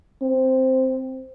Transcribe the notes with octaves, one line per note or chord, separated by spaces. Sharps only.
C4